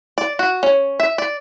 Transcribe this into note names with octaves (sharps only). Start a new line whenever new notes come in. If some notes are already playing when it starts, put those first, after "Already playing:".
D5
F#4
C#4
E5
D5